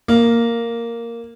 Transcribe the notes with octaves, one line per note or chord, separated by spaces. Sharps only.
A#3